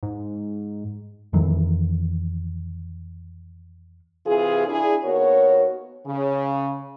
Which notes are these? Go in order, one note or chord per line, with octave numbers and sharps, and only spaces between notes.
G#2
F2 D#3 E3 F#3
C3 E3 F4 G#4
D4 E4 G#4
D#2 B3 F#4 A#4 C#5
C#3